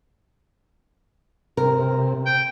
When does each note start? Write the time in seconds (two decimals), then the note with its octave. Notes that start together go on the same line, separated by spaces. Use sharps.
1.57 C3 A#4
2.26 G5